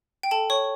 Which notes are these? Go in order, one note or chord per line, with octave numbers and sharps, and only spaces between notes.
G5
A4 A5
C#5 C#6